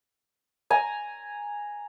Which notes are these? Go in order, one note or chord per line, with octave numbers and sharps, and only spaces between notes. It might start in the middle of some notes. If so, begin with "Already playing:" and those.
G#5 A#5